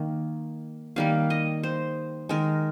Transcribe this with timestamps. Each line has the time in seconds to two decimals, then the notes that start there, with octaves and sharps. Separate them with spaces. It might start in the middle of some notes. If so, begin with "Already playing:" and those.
Already playing: D#3 A#3
0.96 D#3 G3 A#3 F5
1.30 D#5
1.63 C5
2.29 D#3 G#3 A#4